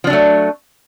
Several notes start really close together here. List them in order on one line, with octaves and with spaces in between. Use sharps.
F3 D4 F#3 A3